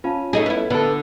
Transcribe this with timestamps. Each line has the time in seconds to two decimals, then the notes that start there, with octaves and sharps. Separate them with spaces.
0.04 C#4 F4 F5 A5
0.33 A3 D#4 G#4
0.46 B3 E4 B4
0.70 D3 B3 A4 B4 B5